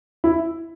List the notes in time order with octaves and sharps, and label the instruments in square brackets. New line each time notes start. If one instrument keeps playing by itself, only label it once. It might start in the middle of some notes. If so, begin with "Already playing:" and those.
[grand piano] E4